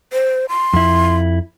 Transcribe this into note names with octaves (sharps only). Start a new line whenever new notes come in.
C5
C6
F2 E4